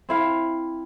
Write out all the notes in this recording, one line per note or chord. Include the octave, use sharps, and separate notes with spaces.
C4 E4 F5